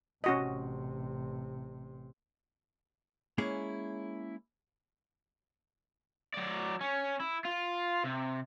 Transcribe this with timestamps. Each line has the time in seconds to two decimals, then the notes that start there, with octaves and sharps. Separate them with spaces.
0.24 A1 C3 C#4 F#4 D#5
3.38 G#3 A#3 C#4 E4 G#4 C#5
6.34 F#3 D5
6.81 C#4
7.20 E4
7.45 F4
8.04 C3